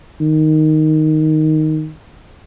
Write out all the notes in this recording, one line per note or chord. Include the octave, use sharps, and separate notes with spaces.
D#3